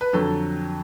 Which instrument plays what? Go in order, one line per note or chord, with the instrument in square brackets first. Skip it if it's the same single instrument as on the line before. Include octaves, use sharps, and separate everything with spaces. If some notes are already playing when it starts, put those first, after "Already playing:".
[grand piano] B4
F2 D3 F#3 A4